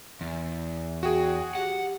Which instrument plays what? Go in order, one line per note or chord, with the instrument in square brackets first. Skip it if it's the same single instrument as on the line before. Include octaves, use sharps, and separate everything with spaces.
[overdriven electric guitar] E2
[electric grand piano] F#4 G#4 [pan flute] G5
[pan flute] G4 [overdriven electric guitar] F#5